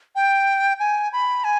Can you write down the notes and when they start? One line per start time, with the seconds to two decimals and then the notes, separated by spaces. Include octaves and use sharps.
0.15 G5
0.79 G#5
1.13 B5
1.44 G#5